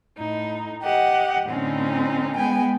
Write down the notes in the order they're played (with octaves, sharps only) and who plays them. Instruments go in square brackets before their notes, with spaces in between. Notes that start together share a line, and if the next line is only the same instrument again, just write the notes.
[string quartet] A2 D#4
G4 D#5 F#5
A2 D3 C4 C#4 D#4
G#3 B3 G5 G#5